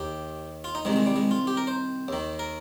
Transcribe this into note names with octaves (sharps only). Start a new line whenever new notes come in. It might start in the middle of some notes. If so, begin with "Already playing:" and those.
Already playing: D#2 D#3 G4
F4
D#4
C2 C3 D#3 G#3
G#3
G3
G#3
F4
G4
A#4
C5
D#2 D#3
A#4